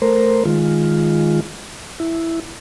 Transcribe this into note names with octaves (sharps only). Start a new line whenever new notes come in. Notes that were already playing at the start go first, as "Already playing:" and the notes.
A3 A#4 C5
D#3 G#3 F4
E4